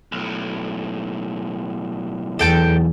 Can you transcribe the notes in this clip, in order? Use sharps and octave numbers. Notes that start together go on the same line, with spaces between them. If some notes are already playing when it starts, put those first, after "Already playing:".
B1 A2
E2 A4 G5 A5